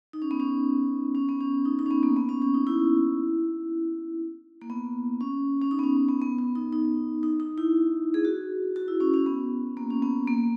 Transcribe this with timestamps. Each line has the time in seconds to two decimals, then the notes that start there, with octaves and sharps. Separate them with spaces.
0.13 D#4
0.22 C#4
0.31 B3
0.40 C#4
1.15 C#4
1.29 B3
1.40 C#4
1.65 D#4
1.79 D#4
1.86 C#4
1.91 B3
2.03 A#3
2.16 B3
2.29 C#4
2.42 C#4
2.54 D#4
2.67 E4
4.61 A#3
4.70 B3
5.21 C#4
5.62 C#4
5.71 D#4
5.79 B3
5.84 C#4
5.97 B3
6.09 B3
6.22 B3
6.38 B3
6.55 D#4
6.73 D#4
7.23 D#4
7.40 D#4
7.58 E4
8.14 G#4
8.25 F#4
8.76 F#4
8.88 E4
9.00 C#4
9.14 C#4
9.26 B3
9.77 A#3
9.90 C#4
10.02 B3
10.27 A#3